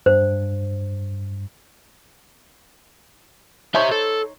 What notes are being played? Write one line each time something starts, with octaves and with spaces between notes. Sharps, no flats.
G2 C5
D#4 G4 C5 C#5 E5
A4